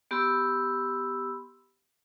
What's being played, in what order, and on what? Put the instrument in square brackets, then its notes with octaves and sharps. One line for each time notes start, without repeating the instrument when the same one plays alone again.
[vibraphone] B3 G4 B5 C6 E6